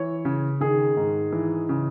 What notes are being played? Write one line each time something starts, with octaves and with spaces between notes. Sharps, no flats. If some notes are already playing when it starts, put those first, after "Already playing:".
Already playing: E3 C#5
C#3
D#3 G#4
G#2
E3
C#3